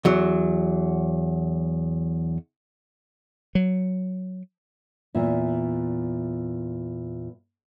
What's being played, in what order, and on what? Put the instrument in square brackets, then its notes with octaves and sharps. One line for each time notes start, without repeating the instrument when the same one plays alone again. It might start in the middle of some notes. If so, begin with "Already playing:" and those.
[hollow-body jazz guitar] E2 F#3
[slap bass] F#3
[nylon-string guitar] E2 A#2 E5